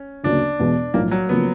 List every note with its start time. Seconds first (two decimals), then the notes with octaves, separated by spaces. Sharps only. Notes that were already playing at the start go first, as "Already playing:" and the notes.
Already playing: C#4
0.24 D2 C#3 F#3 A#3 D4
0.60 E2 B2 G#3 B3 D4
0.94 B1 A2 F3 A#3
1.11 F#3
1.29 C#3 F3 A#3 B3